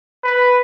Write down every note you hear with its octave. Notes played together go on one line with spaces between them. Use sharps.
B4